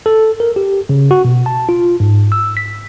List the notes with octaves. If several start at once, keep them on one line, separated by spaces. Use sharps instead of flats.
A4
A#4
G4
C#3
F#4
B2
A5
F4
G#2
E6
B6